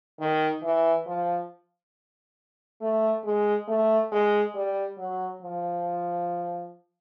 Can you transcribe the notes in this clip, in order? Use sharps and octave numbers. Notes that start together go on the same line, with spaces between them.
D#3
E3
F3
A3
G#3
A3
G#3
G3
F#3
F3